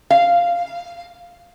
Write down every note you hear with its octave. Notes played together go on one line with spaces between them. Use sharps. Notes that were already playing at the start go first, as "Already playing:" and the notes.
F5